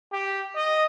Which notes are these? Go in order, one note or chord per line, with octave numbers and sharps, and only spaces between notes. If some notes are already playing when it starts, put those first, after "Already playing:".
G4
D#5